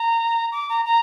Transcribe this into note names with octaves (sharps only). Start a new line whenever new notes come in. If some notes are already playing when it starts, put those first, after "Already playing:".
Already playing: A#5
D6
A#5
A#5